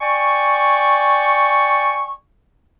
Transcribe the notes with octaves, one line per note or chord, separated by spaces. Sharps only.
D5 G5 G#5 C#6